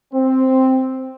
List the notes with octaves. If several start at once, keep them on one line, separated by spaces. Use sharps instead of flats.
C4